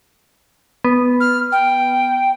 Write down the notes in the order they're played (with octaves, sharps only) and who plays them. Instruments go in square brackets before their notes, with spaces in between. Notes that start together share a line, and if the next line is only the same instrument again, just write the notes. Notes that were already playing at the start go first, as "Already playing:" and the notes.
[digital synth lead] B3
[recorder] F6
G5